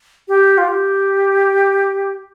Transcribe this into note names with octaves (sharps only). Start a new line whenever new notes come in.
G4
F4
G4